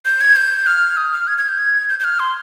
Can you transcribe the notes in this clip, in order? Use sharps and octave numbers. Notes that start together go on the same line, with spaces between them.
G6
G#6
G6
F6
D#6
F6
G#6
G#6
G6
G#6
G6
G6
F6
C6